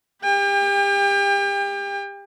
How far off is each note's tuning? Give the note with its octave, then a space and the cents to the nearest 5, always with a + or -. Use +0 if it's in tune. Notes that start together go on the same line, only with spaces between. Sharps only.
G4 +30 G5 +40